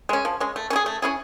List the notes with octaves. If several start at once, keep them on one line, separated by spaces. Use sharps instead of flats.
G#3 C#4
F3
G#3 C#4
A3
C#4 E4
G#4
A3
C#4 E4 G#4